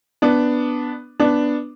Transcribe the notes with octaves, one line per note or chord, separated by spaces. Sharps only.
B3 D4
B3 D4